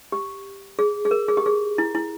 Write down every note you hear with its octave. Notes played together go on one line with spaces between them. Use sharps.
G4
G#4
G#4
A#4
G#4
G4
G#4
E4
E4